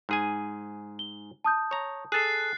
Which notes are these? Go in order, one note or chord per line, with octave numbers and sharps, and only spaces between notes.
G#2 G#4 G#5
G7
A5 D#6 G6
C#5 A#5
G#4 A4 F#6 A6 C7